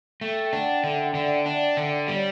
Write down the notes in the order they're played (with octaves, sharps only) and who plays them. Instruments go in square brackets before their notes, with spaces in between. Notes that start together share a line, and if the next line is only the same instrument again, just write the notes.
[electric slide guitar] A3 [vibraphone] G5
[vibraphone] G5
[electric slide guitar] D4 [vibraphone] F#5
[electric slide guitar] D3 [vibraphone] E5
[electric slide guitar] D3 [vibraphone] D5
[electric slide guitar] D4
D3
[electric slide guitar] G3 [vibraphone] D5
[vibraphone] C#5